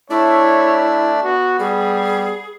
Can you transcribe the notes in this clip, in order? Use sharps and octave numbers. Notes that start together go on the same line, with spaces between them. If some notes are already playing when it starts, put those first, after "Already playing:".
A3 D4 E4 C#5 D5
B3 F#4
G3 G#4